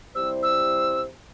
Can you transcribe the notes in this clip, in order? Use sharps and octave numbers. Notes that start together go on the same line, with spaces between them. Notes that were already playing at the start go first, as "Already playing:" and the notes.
C3 G3 E4 G4 C5 E6
E6